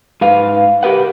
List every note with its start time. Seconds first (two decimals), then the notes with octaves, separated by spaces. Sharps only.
0.21 G#2 B4 F5
0.83 G4 A#4 B4 F#5